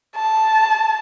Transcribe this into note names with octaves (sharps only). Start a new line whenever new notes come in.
A5